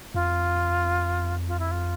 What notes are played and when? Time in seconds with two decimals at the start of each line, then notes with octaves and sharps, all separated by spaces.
0.14 F2 F4
1.48 F4
1.59 E4
1.71 F4